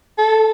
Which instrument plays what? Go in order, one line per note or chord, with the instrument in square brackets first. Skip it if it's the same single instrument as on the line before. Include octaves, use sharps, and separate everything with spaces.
[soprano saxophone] A4